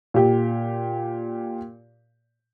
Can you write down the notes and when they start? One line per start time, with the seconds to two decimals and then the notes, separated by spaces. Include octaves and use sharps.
0.14 A#2 G4